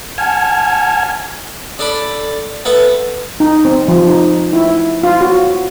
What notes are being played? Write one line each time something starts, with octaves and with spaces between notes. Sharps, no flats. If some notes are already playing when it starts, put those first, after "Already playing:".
F#5 G#5 A5 F6 G#6
D4 A4 D5 B5
B3 A4 B4 E5 A5
D#4
C4
F3
D#4
E4
F4
F#4